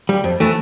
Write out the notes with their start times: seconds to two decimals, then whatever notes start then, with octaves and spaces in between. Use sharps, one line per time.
0.09 G3
0.24 F2
0.40 E3 A3